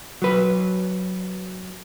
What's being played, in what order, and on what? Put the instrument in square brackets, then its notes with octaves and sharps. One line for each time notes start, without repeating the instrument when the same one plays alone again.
[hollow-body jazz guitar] F#3 B4